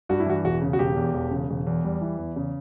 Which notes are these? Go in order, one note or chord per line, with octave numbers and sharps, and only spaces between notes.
G2 F#4
E4
E3 F#4
E1 F#4
C#3
F#4
E1 G4
E2
E1
C#3
E1
E2
G3
E3
E2
C#3